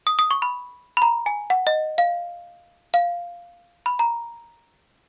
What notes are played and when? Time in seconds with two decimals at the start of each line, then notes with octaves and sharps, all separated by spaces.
0.07 D#6
0.19 D#6
0.31 C#6
0.42 B5
0.97 B5
1.02 A#5
1.26 G#5
1.50 F#5
1.67 D#5
1.98 F5
2.94 F5
3.86 B5
3.99 A#5